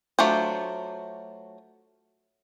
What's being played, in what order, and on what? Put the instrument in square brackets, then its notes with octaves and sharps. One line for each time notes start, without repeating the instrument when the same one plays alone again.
[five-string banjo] F#3 A3 D4 F4 C5